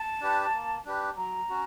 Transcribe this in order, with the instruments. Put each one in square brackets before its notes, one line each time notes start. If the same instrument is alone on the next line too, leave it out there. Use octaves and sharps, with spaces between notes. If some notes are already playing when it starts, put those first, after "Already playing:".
Already playing: [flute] A5
[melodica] D4 G4 B4
A#3
D4 G4 B4
[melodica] F#3 [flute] A#5
[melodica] C#4 F#4